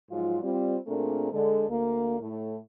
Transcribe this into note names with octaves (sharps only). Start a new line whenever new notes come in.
G#2 F3 F#3 F4
G3 C4 F4
A#2 A3 C4 D4 G#4 A#4
D3 G#3 A4
D2 A#3
A2 A3